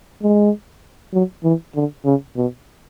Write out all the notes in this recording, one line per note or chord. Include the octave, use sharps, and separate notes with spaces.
G#3
F#3
E3
D3
C#3
B2